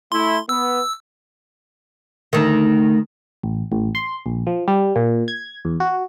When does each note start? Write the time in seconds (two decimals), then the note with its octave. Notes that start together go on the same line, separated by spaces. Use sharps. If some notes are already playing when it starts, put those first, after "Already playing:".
0.12 A3 E4 C6
0.49 B3 E6
2.33 D2 D#3
3.43 A1
3.72 A1
3.95 C6
4.26 A#1
4.47 F3
4.68 G3
4.96 A#2
5.28 G#6
5.65 E2
5.80 F#4